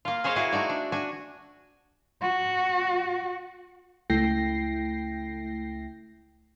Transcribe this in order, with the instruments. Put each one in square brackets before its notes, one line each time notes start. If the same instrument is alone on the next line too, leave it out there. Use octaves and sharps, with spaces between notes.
[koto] A#3 F4
G#4 C5 C#5 D#5 F5
E4 F#4 G#4 A#4
A3 D#4 F#4 D5
D4
D4 F#4 G#5
[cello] F#4
[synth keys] C#2 A3 E4 G5 A#6 C7